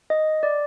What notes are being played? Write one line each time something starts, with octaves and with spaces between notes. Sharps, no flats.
D#5
D5